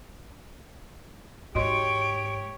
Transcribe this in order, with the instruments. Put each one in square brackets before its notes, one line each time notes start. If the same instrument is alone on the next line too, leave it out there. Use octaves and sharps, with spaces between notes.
[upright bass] G#2 [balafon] F#4 D#5 C6 [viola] G4 C#5 [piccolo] D7